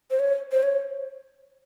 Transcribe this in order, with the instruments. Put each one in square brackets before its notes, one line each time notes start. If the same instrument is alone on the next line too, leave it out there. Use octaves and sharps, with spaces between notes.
[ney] C5
C#5
C5
C#5